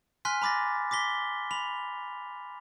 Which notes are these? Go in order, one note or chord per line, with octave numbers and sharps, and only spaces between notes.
G#5 C6 F6 F#6 B6
A#5 B5 D6 A6 A#6
D6 A#6 B6 G7
B5 F7